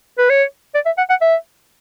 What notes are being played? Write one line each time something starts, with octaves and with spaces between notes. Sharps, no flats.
B4
C#5
D5
E5
F#5
F#5
E5